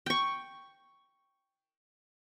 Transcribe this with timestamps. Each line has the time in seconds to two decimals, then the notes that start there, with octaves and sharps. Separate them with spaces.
0.06 G5 C#6